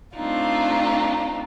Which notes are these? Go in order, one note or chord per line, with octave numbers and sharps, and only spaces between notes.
A3 C4 D4 D#4 F4